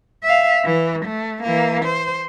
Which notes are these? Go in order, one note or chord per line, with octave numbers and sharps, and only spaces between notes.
E5 F5
E3
A3
E3 A#3
C5